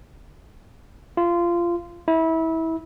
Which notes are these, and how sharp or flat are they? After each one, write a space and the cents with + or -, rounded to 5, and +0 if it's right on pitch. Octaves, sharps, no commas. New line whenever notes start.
F4 -20
E4 -25